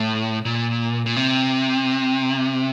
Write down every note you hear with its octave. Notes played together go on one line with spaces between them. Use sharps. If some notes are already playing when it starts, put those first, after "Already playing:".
Already playing: A2
A#2
A#2
C3